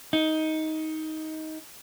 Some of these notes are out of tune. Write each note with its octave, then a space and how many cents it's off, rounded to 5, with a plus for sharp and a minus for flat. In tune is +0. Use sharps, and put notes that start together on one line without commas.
D#4 +15